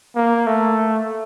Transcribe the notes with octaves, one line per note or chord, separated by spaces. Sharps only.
A#3
A3